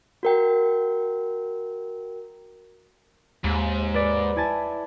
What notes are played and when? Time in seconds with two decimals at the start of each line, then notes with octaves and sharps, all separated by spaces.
0.23 F#4 A#4 G5
3.44 D#2 G#2
3.94 B4 D5
4.36 E4 G#5 A5